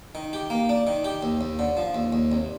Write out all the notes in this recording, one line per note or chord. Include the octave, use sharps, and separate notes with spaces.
D#3
G4
A#3
D4
D#3
G4
D#2
D#2
D3
F3
D#2
D#2
C2